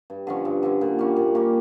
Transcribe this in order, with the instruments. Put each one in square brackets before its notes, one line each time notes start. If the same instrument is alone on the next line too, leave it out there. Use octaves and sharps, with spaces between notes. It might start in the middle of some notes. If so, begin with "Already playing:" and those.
[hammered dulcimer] G2
D3 F3 C#4
G2
D3 F3 C#4
A#2
G3 A#3 C#4
A#2
G3 A#3 C#4